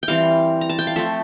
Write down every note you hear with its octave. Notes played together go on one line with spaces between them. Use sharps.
G5
E3 G3 C4 F5
A#5
A5
G5
F5
F3 A3 C4 E5